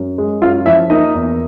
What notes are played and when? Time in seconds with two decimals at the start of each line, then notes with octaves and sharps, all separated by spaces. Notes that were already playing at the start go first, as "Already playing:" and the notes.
Already playing: F#2
0.18 G#3
0.42 F#2 F4 F5
0.66 F3 E4 E5
0.90 A#3 D#4 D#5
1.15 E2